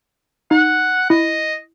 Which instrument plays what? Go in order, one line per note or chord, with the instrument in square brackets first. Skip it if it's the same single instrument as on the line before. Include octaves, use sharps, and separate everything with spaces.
[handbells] D#4 [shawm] F#5
[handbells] E4 [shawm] D#5